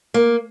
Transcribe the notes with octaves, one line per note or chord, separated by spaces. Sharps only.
A#3